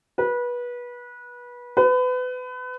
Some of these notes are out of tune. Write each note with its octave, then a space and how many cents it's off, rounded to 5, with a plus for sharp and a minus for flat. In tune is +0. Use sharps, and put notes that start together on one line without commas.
B4 -25
B4 +30